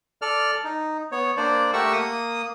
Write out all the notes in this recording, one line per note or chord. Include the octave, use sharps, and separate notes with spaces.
A4 D5 F6
D#4
B3 C#5
A#3 D4 C5 D5
A3 G4 A#4 F#5 C#6 E6
A#3 D#6